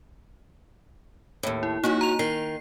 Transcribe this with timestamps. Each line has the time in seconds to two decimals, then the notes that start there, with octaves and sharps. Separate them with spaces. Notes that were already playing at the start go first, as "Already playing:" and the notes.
1.43 D#2 A2
1.63 E4
1.83 F2 F#3 A#3 D#4 F#4
2.01 A#5 F7
2.19 D#3 C7